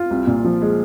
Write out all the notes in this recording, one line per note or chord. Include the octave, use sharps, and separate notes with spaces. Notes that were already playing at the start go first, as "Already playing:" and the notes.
Already playing: F4
C2
A#2
F3
G#3